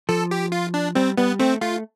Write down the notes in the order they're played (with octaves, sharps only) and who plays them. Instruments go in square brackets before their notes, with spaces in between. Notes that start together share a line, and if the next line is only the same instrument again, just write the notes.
[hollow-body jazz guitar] F3 [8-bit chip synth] A4
[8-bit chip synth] G4
F4
D4
[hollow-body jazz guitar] G3 [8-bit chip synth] C4
[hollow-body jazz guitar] G3 [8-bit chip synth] B3
[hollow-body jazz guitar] A3 [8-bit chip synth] C4
[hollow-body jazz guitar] A3 [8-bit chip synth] F4